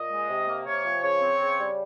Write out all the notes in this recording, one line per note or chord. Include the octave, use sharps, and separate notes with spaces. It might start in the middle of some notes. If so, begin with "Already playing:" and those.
Already playing: A#2 D#5
G#3
C3
A#3
C3 C#5
F3
C#3 C#5
C4
C#3
G3